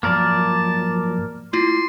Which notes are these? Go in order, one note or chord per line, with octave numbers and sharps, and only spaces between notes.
G#2 F3 F#3 A#3 A#4 D5 A5
A3 E4 F4 C6